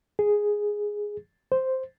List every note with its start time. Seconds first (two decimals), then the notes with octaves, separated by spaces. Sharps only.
0.19 G#4
1.52 C5